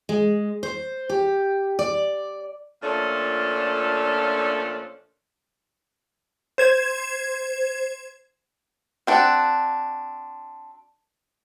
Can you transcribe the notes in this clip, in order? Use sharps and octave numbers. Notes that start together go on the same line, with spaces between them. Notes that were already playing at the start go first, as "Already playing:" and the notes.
G#3
C5
G4
D5
A#2 F3 A3 C#4 D4 A4
C5 G#6 E7
C4 D4 F#4